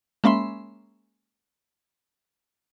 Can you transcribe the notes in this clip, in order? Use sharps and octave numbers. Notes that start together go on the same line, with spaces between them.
G#3 A#3 C#4 E5 B5 C6